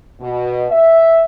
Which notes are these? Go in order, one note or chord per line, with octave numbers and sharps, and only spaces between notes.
B2
E5